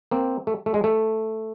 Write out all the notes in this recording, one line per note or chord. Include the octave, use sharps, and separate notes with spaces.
A#3 C4
A3
A3
G#3
A3